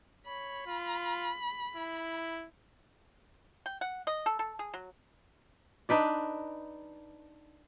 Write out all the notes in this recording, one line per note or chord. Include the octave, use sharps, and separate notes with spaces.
C#5 B5
F4
E4
G5
F#5
D#5
A4
A4
G#4
F#3
D4 D#4 B4 D5